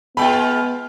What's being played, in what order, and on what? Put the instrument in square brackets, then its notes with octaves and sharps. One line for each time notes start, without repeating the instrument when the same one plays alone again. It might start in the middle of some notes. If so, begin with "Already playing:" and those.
[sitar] G#3 F4 [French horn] B3 [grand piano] G5 B5